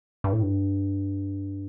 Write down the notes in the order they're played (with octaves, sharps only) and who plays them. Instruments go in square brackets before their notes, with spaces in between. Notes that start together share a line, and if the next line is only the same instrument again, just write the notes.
[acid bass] G2
A2
G2